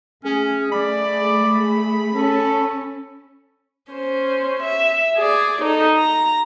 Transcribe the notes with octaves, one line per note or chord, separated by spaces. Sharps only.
A3 C#4 G#4
A3 D5 B5
C#4 A4
C#4 C5
E5
G#4 D5
D#4 A4
A#5